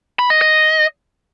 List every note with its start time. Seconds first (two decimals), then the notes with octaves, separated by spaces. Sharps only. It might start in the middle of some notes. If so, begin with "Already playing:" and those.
0.19 B5
0.30 D#5
0.41 D#5